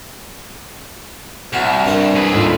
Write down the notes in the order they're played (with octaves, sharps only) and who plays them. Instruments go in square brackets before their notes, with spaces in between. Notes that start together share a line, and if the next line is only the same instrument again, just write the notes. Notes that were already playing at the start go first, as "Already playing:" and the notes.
[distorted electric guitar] C2 [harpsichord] F#4
[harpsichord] G2 D4 A#4
[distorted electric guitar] G#4 B4
[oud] D#2 A2 F4